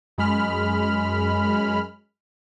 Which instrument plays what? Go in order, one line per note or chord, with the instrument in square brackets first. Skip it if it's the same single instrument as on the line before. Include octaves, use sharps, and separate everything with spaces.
[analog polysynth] F#2 G#3 B5 F6